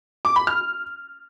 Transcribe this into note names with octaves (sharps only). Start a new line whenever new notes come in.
D6
B5
F6